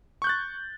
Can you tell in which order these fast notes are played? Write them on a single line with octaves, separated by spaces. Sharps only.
C#6 G6 F#6 A6